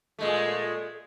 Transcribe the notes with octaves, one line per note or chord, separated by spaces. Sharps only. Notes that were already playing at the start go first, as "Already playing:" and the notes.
A#2 G#3 A3